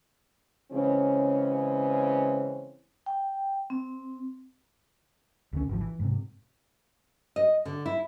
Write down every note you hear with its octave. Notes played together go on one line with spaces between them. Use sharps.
C#3 E3 G#3 C4 C#4
G5
C4
D2 C#4
G#1 F3
E3
G#2 C3
D#5
D3
E4